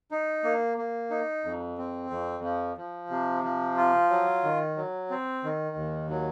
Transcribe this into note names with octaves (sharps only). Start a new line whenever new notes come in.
D#4
A#3
A#3
D#4
F2
C4
F2
F3
F3
C3
F3
F4
F#3
D#3
F#3
C4
D#3
D#2
F#3